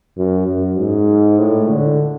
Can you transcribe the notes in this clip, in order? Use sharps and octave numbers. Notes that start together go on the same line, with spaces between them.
F#2
F#2
G#2
A2
D3